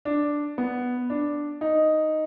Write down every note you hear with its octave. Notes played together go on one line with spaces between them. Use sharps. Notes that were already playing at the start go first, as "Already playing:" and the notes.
D4
B3
D4
D#4